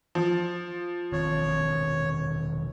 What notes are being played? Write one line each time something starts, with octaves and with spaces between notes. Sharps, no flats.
F3
E1 D#3 C4 C#5